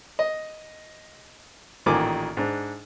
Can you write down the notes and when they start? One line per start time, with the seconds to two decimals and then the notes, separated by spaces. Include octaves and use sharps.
0.19 D#5
1.86 A1 A#2 D#3 G#5 D6
2.37 G#2 D4